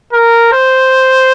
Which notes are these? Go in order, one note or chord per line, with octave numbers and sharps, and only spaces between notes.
A#4
C5